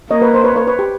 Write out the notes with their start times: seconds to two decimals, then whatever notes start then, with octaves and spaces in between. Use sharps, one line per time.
0.11 A#3 C#5 D#5
0.22 B4 C#5
0.34 C5
0.44 B4 C#5
0.56 B4 C#5
0.67 B4 C#5
0.79 G4